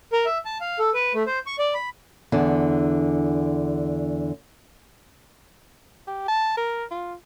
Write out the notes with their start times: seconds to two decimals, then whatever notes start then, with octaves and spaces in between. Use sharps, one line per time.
0.13 A#4
0.25 E5
0.45 A5
0.61 F5
0.79 A4
0.94 B4
1.14 A3
1.27 C5
1.47 C#6
1.59 D5
1.74 B5
2.32 E2 D3 D4
6.07 G4
6.28 A5
6.57 A#4
6.91 F4